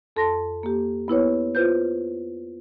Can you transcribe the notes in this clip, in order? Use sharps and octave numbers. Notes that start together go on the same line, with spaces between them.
F2 A4 A5 C6 A#6
A#3 G4
B3 E4 B4 C#5
F4 B4 C5 G6